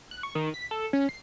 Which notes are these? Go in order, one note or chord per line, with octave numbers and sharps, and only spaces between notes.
F#6
C#6
D#3
B6
A4
C#4
C7